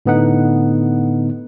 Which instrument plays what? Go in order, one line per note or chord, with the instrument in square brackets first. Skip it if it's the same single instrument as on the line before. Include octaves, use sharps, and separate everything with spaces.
[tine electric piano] A2 D3 B3 D#4 F#5